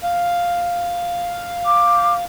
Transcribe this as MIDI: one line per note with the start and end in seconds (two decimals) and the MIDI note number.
0.03 2.24 77
1.65 2.14 86